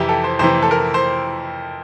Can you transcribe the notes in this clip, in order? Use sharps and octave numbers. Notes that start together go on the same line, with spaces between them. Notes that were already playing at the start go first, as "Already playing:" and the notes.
Already playing: F2 C3 E3 E4 G4
A4
C5
F2 C3 E3 C5
A4
A#4
C5